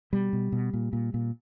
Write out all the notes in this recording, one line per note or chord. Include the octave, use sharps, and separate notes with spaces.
B2 G3
B2
B2
A#2
A#2
A#2